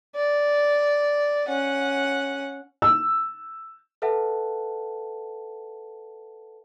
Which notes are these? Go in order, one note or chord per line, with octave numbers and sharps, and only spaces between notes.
D5
C#4 F#5
E6
A4 B4 E5 F#5 A5